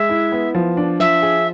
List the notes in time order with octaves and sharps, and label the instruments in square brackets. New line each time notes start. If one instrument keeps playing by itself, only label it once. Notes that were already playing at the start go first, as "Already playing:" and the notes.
Already playing: [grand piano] G#3 [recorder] E5
[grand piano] E4
B3
F3
D4
[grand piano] F3 [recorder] E5
[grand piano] G#4